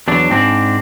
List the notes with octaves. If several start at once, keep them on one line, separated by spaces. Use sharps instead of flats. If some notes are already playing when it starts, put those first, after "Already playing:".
E2 F#3 D4
G#2 C4 D4